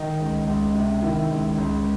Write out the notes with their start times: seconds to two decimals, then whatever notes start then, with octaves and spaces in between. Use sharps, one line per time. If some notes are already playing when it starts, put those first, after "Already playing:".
Already playing: D#3 D#4
0.19 C#2
0.47 C#2
0.74 C3
1.02 D#3 E4
1.30 C#2
1.58 C#2